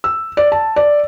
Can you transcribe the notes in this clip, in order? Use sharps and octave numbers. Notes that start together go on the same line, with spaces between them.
E6
D5
A5
D5